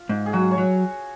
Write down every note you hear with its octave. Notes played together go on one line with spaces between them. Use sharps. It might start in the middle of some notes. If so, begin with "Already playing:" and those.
Already playing: F4
G#2
G#4
F#3 F#4
C#5
F#3